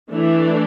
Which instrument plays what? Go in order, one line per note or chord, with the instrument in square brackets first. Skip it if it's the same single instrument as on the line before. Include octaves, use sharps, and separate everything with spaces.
[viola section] E3 A3 D4